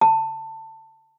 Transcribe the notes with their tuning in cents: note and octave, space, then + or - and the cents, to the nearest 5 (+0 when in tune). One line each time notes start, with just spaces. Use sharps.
A5 +20